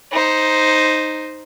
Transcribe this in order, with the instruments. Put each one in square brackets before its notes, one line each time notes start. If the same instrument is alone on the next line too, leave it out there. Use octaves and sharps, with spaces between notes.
[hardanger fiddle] D#4 C5